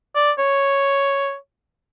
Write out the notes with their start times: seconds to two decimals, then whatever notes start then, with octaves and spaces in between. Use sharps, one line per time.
0.16 D5
0.39 C#5